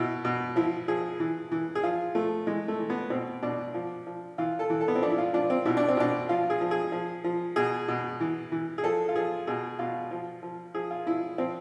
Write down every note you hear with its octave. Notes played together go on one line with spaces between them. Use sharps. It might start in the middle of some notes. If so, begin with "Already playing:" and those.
Already playing: B2 E4
B2
F3 E4
F3 G#4
E3
E3
G#4
F3 F4
F3 A3
E3 G#3
A3
E3
B3
B2 C4
B2 D4
F3
F3
E3 F4
A4
E3
A4
B3
C4
F3 D4
E4
F4
F3 D4
C4
B2 E4
D4
C4
B2 D4
F3 F4
G#4
F3
G#4
F3
F3
B2 G#4
B2
E3
E3
G#4
F3 A4
F4
F3 G#4
B2 G#4
B2 F4
F3
F3
F3 G#4
F4
F3 E4
F3 C4